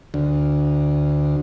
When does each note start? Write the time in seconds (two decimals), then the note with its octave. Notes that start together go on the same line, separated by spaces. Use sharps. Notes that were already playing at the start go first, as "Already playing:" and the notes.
0.14 D2